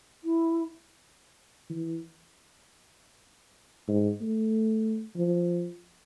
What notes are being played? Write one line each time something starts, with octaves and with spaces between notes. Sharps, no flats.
E4
E3
G#2
A3
F3